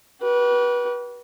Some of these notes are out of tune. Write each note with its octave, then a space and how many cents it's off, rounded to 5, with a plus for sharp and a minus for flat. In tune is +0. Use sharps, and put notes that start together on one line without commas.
G4 -45 B4 -25